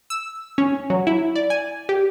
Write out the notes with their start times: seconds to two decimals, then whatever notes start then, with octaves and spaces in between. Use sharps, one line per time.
0.10 E6
0.58 C#4
0.90 F#3
1.07 E4
1.36 D5
1.50 G#5
1.89 G4